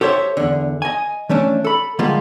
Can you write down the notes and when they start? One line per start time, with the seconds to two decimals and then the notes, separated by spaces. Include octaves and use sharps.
0.01 G4 A4 C5 C#5 E5
0.37 E2 D3
0.82 D#5 G#5
1.29 E3 A3 C#4 D4
1.65 A4 B5
1.99 D3 F3 G3 G#3 A#3 F4